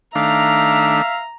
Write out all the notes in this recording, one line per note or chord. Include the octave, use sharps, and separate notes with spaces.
D#3 A3 D4 E5 F5 A#5